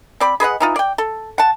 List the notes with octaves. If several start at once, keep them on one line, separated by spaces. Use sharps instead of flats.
C4 D5 B5
G#4 B4 D#5 F#5
E3 D#4 F4
D5 G5
A4
F#5 A5